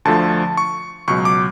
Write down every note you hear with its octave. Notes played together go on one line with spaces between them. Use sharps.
D2 D3 F3 A3 A5
C#6
C#2 B2 F#3 C#6
D6